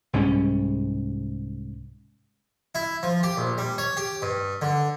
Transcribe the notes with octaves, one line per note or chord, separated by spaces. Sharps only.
C2 G#2 G3 C#4
E4
F3
G4
A#1
G3
C#5
G4
G2
D3